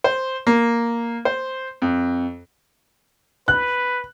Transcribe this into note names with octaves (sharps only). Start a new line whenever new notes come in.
C5
A#3
C5
F2
B4 F#6